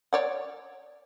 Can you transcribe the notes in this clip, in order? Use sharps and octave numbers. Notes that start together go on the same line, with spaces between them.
C#5 D5 F#5